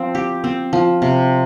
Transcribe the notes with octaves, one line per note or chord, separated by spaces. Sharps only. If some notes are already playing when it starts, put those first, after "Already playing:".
Already playing: F3 C4
G4
C4
F3
C3